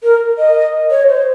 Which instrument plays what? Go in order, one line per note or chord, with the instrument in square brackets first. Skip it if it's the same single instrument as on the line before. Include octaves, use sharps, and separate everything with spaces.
[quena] A#4
D#5
C#5
C5